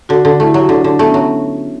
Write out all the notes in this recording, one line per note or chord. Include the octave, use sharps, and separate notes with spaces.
D3 F#4
D3
A3 E4
G4
F#3
F#4
D3 D4
D3 D4
A3 B3
C#4
F#3